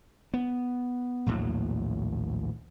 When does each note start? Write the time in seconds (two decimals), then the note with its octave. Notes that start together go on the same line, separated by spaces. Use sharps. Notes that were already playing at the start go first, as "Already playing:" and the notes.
0.34 B3
1.26 A#1 D#2 A2 F#3